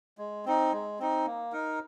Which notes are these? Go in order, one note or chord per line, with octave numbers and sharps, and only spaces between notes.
G#3
C4 D#4
G#3
C4 D#4
A#3
D#4 A#4